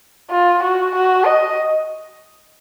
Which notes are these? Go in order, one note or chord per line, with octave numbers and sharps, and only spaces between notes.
F4
F#4
F#4
D#5